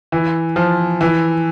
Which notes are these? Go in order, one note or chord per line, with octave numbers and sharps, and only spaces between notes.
E3
F3
E3